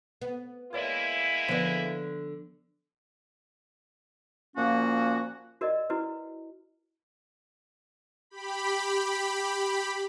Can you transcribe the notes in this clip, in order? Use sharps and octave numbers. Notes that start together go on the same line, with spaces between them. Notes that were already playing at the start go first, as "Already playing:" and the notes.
B3
G#3 A#3 E4 B4 C#5 D5
D3 F3 B3 B4 D5
A#2 F3 A#3 C#4 F#4
F#4 A#4 D5 D#5
E4 F#4 B4
G4 B5